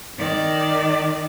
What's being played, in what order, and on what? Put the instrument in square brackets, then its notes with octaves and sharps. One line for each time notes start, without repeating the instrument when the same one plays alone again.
[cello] D#3 D5